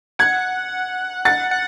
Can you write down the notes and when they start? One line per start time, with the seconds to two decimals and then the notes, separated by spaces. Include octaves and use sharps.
0.19 F#5 G#6
1.25 F#5 A6
1.51 F#5